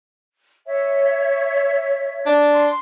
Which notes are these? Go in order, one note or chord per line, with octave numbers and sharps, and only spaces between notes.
C#5 E5
D4
C6